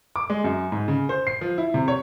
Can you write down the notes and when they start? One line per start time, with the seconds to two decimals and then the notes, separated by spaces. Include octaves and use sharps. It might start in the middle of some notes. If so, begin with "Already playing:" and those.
0.16 D6
0.30 G#3
0.44 F#2
0.72 G#2
0.88 C#3
1.09 C5
1.27 C7
1.41 F3
1.58 E4
1.74 C3
1.88 C#5